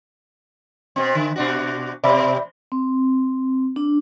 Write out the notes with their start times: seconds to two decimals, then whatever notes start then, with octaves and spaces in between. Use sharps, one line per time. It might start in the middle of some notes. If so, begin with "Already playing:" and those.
0.96 B2 C4
1.15 D3
1.36 B2 D4 F#4
2.04 B2 D5 E5 B5
2.72 C4
3.76 D4